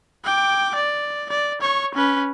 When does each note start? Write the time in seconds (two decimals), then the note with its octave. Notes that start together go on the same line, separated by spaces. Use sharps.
0.24 G5 D6
0.75 D5
1.30 D5
1.61 C#5 C#6
1.95 C#4 B4